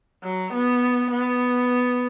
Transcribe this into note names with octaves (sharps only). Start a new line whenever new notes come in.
F#3
B3
B3